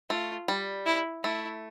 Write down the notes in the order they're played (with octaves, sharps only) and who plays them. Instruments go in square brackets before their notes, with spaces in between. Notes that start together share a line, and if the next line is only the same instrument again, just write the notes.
[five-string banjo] A3 [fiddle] F4
[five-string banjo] G3
[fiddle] E4
[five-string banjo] A3 [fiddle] E4